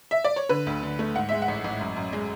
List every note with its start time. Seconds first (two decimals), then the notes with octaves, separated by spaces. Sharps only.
0.11 E5
0.24 D5
0.36 C#5
0.49 D3 B4
0.66 D2
0.83 D3
0.99 A3
1.15 G#2 F#5
1.29 G#3 E5
1.42 F#5
1.48 A1
1.64 A1
1.81 F#2
1.96 F#2
2.13 G#3